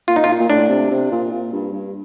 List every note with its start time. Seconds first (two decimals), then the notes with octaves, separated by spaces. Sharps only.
0.08 A#2 F4
0.16 D#4
0.24 F4
0.28 A#2
0.39 A#2
0.49 A2 D4
0.69 C3
0.90 C3
1.11 A#2
1.32 A#2
1.53 G2
1.73 G2